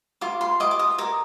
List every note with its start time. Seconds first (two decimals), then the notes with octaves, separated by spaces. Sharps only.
0.21 F4 D6
0.41 C6
0.60 D#5 D6
0.71 D6
0.79 D#6
0.98 A#4 D6